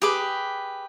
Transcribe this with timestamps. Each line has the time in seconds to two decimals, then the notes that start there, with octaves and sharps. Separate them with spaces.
0.02 G4 G#4 B4 D6